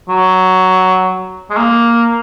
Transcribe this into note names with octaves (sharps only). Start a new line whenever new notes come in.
F#3
G#3
A#3